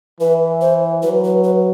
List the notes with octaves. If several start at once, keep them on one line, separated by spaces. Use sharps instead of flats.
E3 B4
C5
F#3 B4
B4
B4